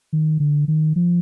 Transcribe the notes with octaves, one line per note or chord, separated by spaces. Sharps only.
D#3
D3
D#3
F3